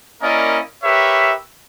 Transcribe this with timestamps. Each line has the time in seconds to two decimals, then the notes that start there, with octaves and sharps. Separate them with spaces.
0.22 A#3 C#4 E4 A#4 D5 D#5
0.83 G4 A#4 B4 C#5 E5